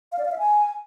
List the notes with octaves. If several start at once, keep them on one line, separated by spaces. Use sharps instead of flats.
F5
D5
F5
E5
G#5